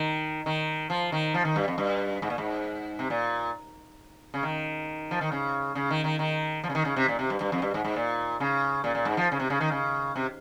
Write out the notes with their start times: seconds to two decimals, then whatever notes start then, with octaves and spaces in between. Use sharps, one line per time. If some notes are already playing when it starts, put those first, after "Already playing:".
Already playing: D#3
0.46 D#3
0.90 F3
1.12 D#3
1.34 F3
1.45 D#3
1.56 G2
1.68 F2
1.78 G2
2.22 G#2
2.30 A#2
2.38 G#2
2.99 C3
3.10 A#2
4.34 C#3
4.43 D#3
5.11 F3
5.21 D#3
5.32 C#3
5.75 C#3
5.91 D#3
6.04 D#3
6.19 D#3
6.64 F3
6.70 C#3
6.75 D#3
6.85 C#3
6.96 C3
7.08 A#2
7.19 C3
7.30 G2
7.41 G2
7.52 F2
7.62 G2
7.74 G#2
7.85 G#2
7.96 A#2
8.40 C#3
8.84 A#2
8.95 A#2
9.05 G#2
9.17 F3
9.32 C#3
9.40 C3
9.50 C#3
9.60 D#3
9.71 C#3
10.16 C3